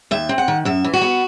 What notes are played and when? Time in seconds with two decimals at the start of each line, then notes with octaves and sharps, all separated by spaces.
0.11 D#2 E5
0.29 C4
0.38 F#5
0.48 D#3
0.65 F#2 E5
0.84 E3
0.93 F#4
1.01 B3